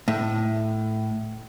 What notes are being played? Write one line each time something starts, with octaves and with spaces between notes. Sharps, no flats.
A2